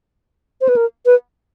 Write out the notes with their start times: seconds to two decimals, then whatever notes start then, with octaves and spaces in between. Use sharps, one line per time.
0.61 C5
0.69 B4
0.76 A#4
1.06 B4